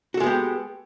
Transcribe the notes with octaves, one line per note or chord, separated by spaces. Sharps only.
G#3 B3 F#4 G4 A4